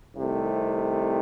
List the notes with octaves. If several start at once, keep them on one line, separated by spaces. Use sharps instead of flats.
C2 C3 D#3 A3